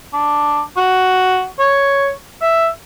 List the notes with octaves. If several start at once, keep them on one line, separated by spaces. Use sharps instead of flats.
D4
F#4
C#5
E5